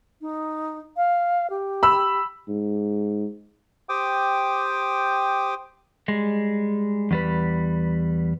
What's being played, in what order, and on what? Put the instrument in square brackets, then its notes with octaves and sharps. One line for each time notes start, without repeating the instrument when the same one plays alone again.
[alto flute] D#4
F5
G4
[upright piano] B5 E6
[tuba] G#2
[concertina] G4 C5 G5 D6 D#6
[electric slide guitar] G3 G#3
E2 G3 B4